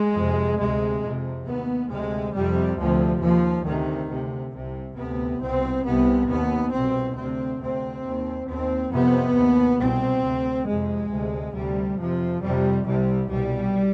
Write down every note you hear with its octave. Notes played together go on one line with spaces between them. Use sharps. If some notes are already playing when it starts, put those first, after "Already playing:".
Already playing: G#3
F2 C3
D2 C3 G#3
F2 C3
D#2 B3
D2 C3 G#3
F2 C3 G3
D2 C3 F3
D#2 F3
D2 C3 D#3
D2 C3
C2 C3
D2 C3 B3
C2 B2 C4
C2 C3 B3
D#2 B3
C2 B2 C4
D2 C3 C4
D2 C3 C4
D#2
D#2 C4
F2 C3 B3
D#2
C2 B2 C4
D2 C3
F2 C3 G#3
D2 C3
D2 C3 G3
F2 C3 F3
F2 C3 G3
C2 C3 G3
C2 B2 G3